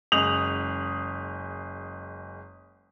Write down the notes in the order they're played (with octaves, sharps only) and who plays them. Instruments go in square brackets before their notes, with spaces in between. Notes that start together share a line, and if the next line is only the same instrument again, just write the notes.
[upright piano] F#1 G#3 D#6 F7 F#7